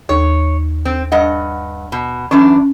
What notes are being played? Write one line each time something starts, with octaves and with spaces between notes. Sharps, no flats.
D#2 C#5
C4
G2 D#5 F#5
B2
F#2 E3 C#4 D4